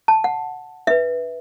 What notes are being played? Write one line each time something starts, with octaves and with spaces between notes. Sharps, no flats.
A5
F#5
D4 B4 E5